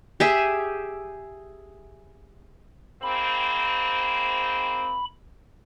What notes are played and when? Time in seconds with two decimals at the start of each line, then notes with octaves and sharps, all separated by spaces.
0.20 G4 G#4 E5
3.03 G#2 A#3 C4 B5